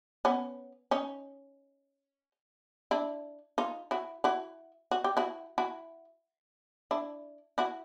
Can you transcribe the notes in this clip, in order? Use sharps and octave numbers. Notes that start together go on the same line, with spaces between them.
B3 C#4
C#4 D#4
D4 E4
D#4 F4
E4 F#4
E4 F#4
F#4
G4
E4 F#4
E4 F#4
D4 E4
E4 F#4